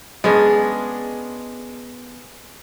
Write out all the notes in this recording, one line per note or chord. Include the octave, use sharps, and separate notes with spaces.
G#3 B3 C#4 D4